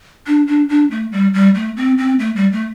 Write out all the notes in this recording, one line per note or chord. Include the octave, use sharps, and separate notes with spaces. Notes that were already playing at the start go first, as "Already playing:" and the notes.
D4
D4
D4
A3
G3
G3
A3
C4
C4
A3
G3
A3